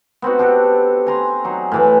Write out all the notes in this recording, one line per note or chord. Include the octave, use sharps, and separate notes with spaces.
B3 C4 D#4 F#4
D4 G4 A4
G#5 A#5 C6
F#3 D#4 G#4
A2 E3 B4